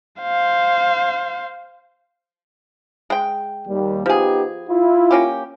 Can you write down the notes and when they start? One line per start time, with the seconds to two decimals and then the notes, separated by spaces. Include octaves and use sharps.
0.22 C5 F5
3.10 G#3 G5
3.67 D#2 G3
4.06 F3 B3 D#4 G4 G#4
4.68 E4 F4
5.11 A#3 C#4 G4